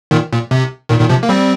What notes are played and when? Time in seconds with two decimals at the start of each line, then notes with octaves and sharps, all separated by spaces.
0.11 A#2 D#3
0.32 A#2
0.51 C3
0.89 A#2 D#3
0.99 A#2 D#3
1.09 C3 F3
1.23 A#3
1.29 G3 C4